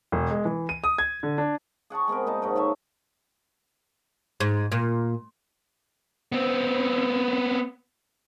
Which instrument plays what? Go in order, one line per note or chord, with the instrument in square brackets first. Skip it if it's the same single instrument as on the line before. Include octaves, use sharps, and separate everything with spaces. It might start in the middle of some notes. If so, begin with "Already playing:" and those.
[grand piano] E1
G#3
E3
D#7
D#6
G#6
D3
D4
[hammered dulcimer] G#4 F#5 A5 C#6
G#3 B3 C4 A#4
A#2 D#4 D#5 A5
G#2 C#3 F#3
A4 C#5 E5 A5
[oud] G#2
A#2
[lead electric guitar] B3 C4